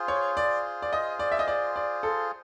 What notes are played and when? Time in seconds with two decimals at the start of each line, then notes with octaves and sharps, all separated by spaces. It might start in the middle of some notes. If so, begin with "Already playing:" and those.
Already playing: F4 G#4 C5
0.08 C#5
0.37 D5
0.82 D5
0.93 D#5
1.19 D5
1.32 E5
1.39 D#5
1.48 D5
1.76 D5
2.03 A4